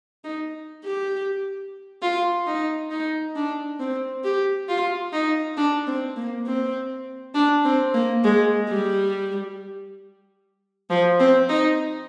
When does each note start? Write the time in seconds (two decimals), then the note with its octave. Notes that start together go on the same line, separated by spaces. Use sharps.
0.24 D#4
0.84 G4
2.02 F4
2.47 D#4
2.91 D#4
3.36 D4
3.80 C4
4.24 G4
4.69 F4
5.13 D#4
5.57 D4
5.87 C4
6.16 A#3
6.46 C4
7.35 D4
7.65 C4
7.94 A#3
8.24 G#3
8.68 G3
10.90 F3
11.20 C4
11.49 D#4